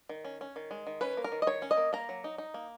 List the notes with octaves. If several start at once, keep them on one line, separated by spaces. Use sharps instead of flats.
D#3
C#4
C#4
D#3
G#3
D#3
C#4 B4
A#3
A#4
D#3
D#5
D#3 C#5
C#4
D#5
A#3
A#3 A#5
F#3
D#4
D#4
A#3